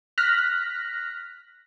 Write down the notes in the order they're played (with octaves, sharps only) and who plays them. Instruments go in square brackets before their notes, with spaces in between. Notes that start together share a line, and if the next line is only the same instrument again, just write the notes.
[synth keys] F6 F#6 A#6 B6